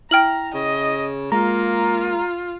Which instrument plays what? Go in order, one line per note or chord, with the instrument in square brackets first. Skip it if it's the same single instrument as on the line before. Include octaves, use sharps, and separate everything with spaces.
[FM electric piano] E4 [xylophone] G5 F6 F#7 [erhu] A#5
[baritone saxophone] C#3 [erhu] D#5
[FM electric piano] G#3 A#5 [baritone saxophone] A#3 [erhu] F4